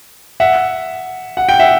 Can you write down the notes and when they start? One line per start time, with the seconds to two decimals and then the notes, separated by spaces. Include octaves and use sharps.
0.40 E5 F#5
1.37 F#5
1.49 G5
1.59 E5 F#5